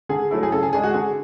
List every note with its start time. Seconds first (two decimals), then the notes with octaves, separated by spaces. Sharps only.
0.09 D3 G#4
0.31 F#3 A3 E4
0.43 G#4
0.52 C#3 A4
0.63 G#4
0.73 G#3 D4 G#4
0.84 F#4
0.94 D3 G#4